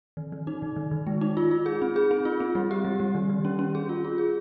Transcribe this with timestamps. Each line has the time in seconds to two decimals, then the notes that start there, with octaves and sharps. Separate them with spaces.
0.17 D#3
0.32 D#3
0.47 D#4
0.62 D#3
0.76 D#3
0.91 D#3
1.07 G#3
1.21 D#4
1.37 F4
1.51 F4
1.66 G#4
1.82 C4
1.96 G#4
2.11 C4
2.25 F4
2.40 C4
2.55 G3
2.71 G4
2.85 G3
3.00 G3
3.15 D#3
3.30 D#3
3.45 C#4
3.59 C#4
3.75 G#4
3.89 F4
4.05 F4
4.18 G#4